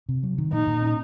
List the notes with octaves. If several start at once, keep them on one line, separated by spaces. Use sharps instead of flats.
C3
F#3
D#3
A#2 D#4
A#2
C#4